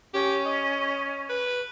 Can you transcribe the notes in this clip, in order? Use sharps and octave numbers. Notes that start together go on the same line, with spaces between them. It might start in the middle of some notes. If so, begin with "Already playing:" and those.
C#4 G4
D#5
B4